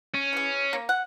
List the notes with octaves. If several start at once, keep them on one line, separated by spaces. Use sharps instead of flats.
C#4
E3 G#4
A#3
F#5